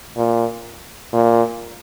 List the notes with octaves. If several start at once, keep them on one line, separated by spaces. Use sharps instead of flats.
A#2
A#2